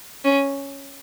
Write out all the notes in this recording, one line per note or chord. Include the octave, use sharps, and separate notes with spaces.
C#4